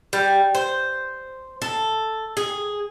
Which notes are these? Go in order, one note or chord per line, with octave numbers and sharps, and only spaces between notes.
G3
C5
A4
G#4